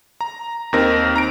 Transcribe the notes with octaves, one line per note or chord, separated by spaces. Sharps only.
A#5
D#2 C4 D#4 A#4 A#6
A#5 D7